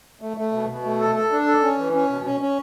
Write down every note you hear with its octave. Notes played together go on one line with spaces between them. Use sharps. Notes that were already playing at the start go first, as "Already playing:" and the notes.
A3
A3
B2
B2
A3
A4
A4
D4
A4
C#4
E3
C#4
B2
C#4
C#4